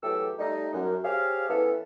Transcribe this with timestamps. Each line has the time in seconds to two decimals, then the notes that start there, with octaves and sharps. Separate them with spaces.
0.03 E2 F#3 A3 G4 A4 E6
0.39 G3 A3 D#4
0.73 F#2
1.04 G4 G#4 C5 C#5 F5
1.49 E3 B3 C#4 E4 A4